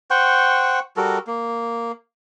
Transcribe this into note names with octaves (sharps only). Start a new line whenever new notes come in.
C5 F#5 G5 C#6
G3 F#4 A4 A#4
A#3